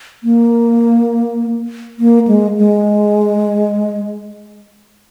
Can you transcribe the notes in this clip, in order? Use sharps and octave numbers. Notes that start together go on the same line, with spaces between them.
A#3
A#3
G#3
G#3